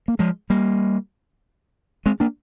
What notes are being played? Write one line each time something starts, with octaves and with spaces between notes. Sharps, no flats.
A#3
F3 G#3
G3 A#3
G#3 C4
A#3 D4